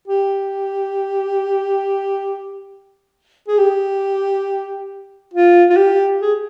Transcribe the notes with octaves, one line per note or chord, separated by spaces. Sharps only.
G4
G#4
G4
F4
F4
G4
G#4